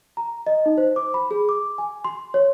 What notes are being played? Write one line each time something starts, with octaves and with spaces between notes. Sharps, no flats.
A#5
D#5
D#4
C5
D6
B5
G#4
D6
G#5
C6
C#5